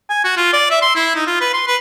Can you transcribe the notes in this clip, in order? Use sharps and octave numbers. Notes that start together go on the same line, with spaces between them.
G#5
F#4
F4
D5
E5
C6
E4
D#4
F4
B4
C6
B4